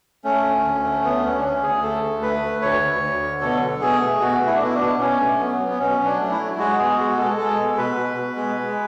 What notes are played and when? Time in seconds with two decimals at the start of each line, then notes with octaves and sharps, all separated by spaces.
0.24 A3 C#4
0.44 D2
0.65 D2
0.84 A3
1.04 D2 B3
1.23 D2 C#4
1.38 D4
1.44 D2 C#4
1.63 D2 G#4
1.83 A3 A4
2.02 D2
2.22 A3 B4
2.42 D2
2.62 D2 C#5
2.82 D2
3.02 D2
3.22 D3
3.41 B2 A4
3.61 F#3
3.81 B2 G#4
4.01 A3
4.20 B2 F#4
4.40 A3
4.47 E4
4.55 D4
4.61 B2 E4
4.74 D4
4.81 B2
5.00 B2 C#4
5.20 A3
5.39 F#3 B3
5.59 F#3
5.69 B3
5.79 B2 C#4
6.00 F#3
6.05 D4
6.19 A3
6.31 E4
6.39 F#3
6.58 G#3 F#4
6.78 B2 G#4
6.98 G#3 F#4
7.18 G#3 A4
7.37 G#3 A4
7.58 B2
7.77 B2 B4
7.97 B2
8.17 B2
8.36 G#3
8.56 G#3